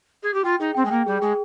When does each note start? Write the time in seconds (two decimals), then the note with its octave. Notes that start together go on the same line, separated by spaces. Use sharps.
0.22 G#4
0.33 G4
0.44 F4 G5
0.60 D#4 G#4
0.75 C4 G5
0.85 G#3
0.91 A#3 G5
1.06 G3 G#4
1.21 G#3 G#4